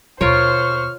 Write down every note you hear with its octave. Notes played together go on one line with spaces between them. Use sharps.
D#2 B2 F4 A#4 C5 C#5 C#6 F6